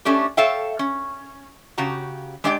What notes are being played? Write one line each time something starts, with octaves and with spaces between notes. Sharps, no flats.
A3 C#4 D4 G4
A4 C#5 E5 F5 G5
C#4
C#3 F#4 G4 A#5
G#3 D4 G4 D5 F#5 G5